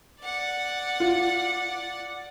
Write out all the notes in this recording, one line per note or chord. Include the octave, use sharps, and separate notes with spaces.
D5 F#5
F4